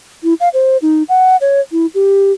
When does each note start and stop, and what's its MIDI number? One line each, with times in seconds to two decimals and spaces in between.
0.24 0.34 64
0.40 0.49 77
0.54 0.77 72
0.82 1.03 63
1.09 1.37 78
1.41 1.61 73
1.72 1.86 64
1.95 2.32 67